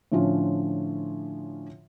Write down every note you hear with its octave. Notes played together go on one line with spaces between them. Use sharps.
A2 D3 F3 C#4 F4